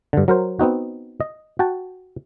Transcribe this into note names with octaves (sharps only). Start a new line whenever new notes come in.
G2 D3
F#3 A#4 C5
B3 C4 D#4 F#4
D#5
F#4 G5 A5